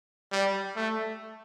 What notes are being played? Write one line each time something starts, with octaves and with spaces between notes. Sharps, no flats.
G3
A3